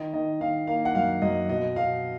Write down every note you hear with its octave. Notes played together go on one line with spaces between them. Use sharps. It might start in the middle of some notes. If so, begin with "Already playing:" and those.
Already playing: D#3 D#5
D#3 D#5
D#3 F5
A#3 F5
F#5
F#2 F5
F#2 D#5
B2 D#5
B2 F5